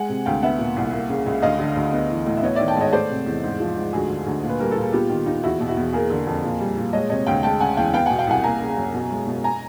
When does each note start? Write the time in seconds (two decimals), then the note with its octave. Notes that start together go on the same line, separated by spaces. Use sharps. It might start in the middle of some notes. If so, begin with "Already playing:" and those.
Already playing: G#3 F#5 G#5
0.09 C3
0.26 D2 F5 G5
0.42 B3 E5 F#5
0.59 A#2
0.76 C2
0.92 A#3
1.09 C#3
1.26 C#2
1.42 D2 D#5 F5
1.59 D3
1.76 D2
1.93 B3
2.09 E3
2.26 A2
2.37 E5
2.42 B3 C#5 D#5
2.55 D#3 D5 E5
2.68 G5 A5
2.76 G#2 C#5 D#5
2.93 A3 C5 D5
3.10 C3
3.26 E2
3.44 G#2
3.60 F3
3.77 G#2
3.93 D2 F#4 G#4
4.10 D3
4.26 D2
4.43 A#2
4.49 B4
4.59 G3 A#4
4.71 A4
4.77 A#2
4.82 G#4
4.93 B3 F4 G4
5.10 D#3
5.26 D#2 D#4 F4
5.43 E2 E4 F#4
5.60 B2
5.68 E4 F#4
5.77 E2
5.93 A#3 G#4 A#4
6.10 D3
6.27 F2
6.44 A#2
6.60 G3
6.77 A#2
6.93 G#3 C#5 D#5
7.10 C3 C#5 D#5
7.27 D2 F5 G5
7.43 G#3 G5 A5
7.60 C#3 F#5 G#5
7.77 E2 F5 G5
7.93 B3 F5 G5
8.06 B2 F#5 G#5
8.18 F5 G5
8.27 C2 F#5 G#5
8.44 A#3 G#5 A#5
8.60 C#3
8.77 F#2
8.94 B2
9.11 G#3
9.27 B2
9.44 G#5 A#5